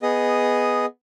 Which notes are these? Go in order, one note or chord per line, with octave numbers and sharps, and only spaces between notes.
B3 G#4 D#5 D#6